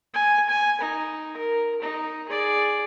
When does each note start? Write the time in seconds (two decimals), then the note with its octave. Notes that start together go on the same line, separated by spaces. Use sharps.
0.14 G#5
0.49 G#5
0.81 D#4
1.37 A#4
1.82 D#4
2.29 G#4 D5